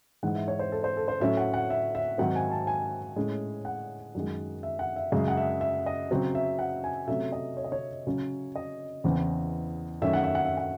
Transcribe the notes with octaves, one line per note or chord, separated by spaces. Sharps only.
G#2 E3 G#3 F#5
E5
C#5
C5
A4
C5
A4
C5
A2 F#3 A3 C#4 E5
F#5
F#5
E5
E5
G#2 D#3 F#3 C4 F#5
G#5
A5
G#5
A2 G#3 C#4
F#5
F#2 D#3 G#3
E5
F#5
E5
F#2 C#3 G#3 E5
F#5
E5
E5
D#5
C#3 F#3 C4
E5
F#5
G#5
C3 F#3 A3 C#4 E5
D#5
C#5
D#5
C#5
C#3 F#3 C#4
D#5
E2 C#3 E3 C4
F#2 D#3 A3 C#4 E5
F#5
E5
F#5
E5
F#5